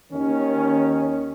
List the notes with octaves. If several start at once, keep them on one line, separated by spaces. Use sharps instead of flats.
D#2 D#3 C#4